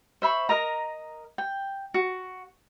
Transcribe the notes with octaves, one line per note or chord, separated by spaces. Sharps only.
C5 E5 B5 C#6
A#4 D#5 A#5
G5
F#4